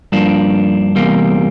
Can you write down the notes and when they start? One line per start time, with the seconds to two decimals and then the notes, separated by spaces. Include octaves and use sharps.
0.12 G2 F3 A#3 D4
0.96 E2 C3 G3 A#3